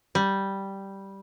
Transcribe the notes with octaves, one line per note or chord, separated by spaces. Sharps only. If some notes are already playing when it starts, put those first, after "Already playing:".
G3